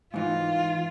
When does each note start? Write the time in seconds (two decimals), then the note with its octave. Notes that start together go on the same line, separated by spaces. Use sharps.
0.14 G#2 E3 D#4 F4